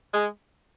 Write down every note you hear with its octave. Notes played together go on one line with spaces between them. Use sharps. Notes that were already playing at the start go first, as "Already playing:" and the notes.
G#3